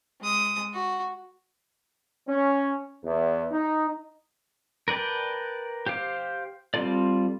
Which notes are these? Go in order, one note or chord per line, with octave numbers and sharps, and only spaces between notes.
G#3 D#6
F#4
C#4
E2
D#4
A#4 B4 D5 G5 A5
G4 C5 F5 D6
G3 C4 F4 A4 D5